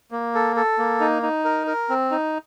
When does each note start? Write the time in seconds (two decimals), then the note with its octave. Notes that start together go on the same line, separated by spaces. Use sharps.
0.11 A#3
0.35 A4
0.56 A4
0.78 A#3
1.00 D#4
1.22 D#4
1.45 A#4
1.67 A#4
1.90 C4
2.11 D#4